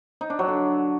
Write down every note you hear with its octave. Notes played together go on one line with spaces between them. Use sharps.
D#4
D4
F#3
D3